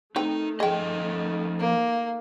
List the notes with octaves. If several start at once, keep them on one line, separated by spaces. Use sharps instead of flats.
D#3 A3 C4 D#4 B4 G5
F3 G#4 D#5 G5
A#3